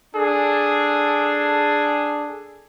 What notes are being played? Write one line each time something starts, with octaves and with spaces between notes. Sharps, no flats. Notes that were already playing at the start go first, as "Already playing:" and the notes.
D4 G#4 A4